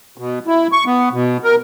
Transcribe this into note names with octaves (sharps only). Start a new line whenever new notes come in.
B2
E4
C#6
B3
B2
A#4